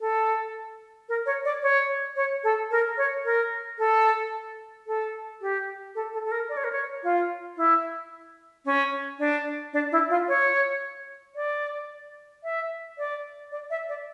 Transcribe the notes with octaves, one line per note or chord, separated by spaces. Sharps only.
A4
A#4
C#5
D5
C#5
C#5
A4
A#4
C#5
A#4
A4
A4
G4
A4
A4
A4
A#4
D5
C#5
A#4
C#5
F4
E4
C#4
D4
D4
E4
F4
C#5
D5
E5
D5
D5
E5
D5